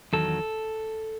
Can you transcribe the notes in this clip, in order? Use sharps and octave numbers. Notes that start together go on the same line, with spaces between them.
E2 D#3 F#3 A4